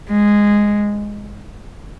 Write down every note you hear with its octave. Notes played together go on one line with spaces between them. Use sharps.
G#3